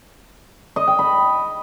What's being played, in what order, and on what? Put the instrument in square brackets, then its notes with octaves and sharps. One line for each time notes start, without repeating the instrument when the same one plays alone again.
[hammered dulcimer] D#5
G5
B5